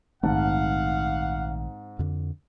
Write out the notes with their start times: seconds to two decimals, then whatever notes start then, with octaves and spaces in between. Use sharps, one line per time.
0.23 A#1 G#2 D#3 A3 C4 F5 F#5 A5
1.99 F2 D3